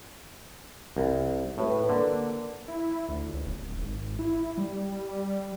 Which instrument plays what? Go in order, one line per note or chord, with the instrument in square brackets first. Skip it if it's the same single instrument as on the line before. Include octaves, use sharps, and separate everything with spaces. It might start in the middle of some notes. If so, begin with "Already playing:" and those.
[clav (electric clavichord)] C2
[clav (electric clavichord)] A2 [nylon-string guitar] F#4 B4 E5
[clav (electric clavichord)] D3 [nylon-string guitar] A#3 D4
[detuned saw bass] E4
D2
C#2
D1
G#1
E4
G3